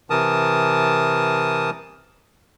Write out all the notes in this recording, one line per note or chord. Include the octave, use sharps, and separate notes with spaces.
C3 E3 A#4 A5 D#6